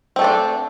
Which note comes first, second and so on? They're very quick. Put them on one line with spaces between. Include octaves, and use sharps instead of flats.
C4 A3 A4 D4